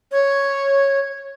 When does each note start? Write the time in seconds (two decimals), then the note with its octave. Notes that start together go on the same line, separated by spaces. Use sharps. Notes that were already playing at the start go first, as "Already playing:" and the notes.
0.12 C#5